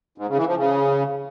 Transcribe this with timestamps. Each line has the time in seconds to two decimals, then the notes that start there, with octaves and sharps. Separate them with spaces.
0.18 G#2
0.28 C#3
0.38 E3
0.47 F3
0.57 C#3